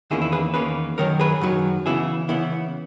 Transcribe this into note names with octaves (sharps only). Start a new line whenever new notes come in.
E2 D#3 A#3 C#4 E4 G#4
E4
G#4 B4
E2 D#3 A#3 C#4 G#4 B4
F#2 D#3 F#3 A#4 C#5
G#4 B4
F#2 D#3 F#3
C#3 E3 B3 E4 G#4
C#3 E3 B3 E4